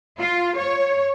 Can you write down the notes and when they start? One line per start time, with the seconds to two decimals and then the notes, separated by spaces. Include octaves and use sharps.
0.19 F4
0.58 C#5